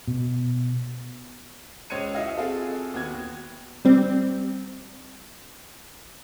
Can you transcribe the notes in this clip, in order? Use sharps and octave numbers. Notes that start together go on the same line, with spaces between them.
B2
C#2 C5 C#5 G#6 C#7 D#7
E4 F#4 D#5 F5
C4 F4 F#4 G#4 A4
D#2 B3 F#4 G#6
G3 C4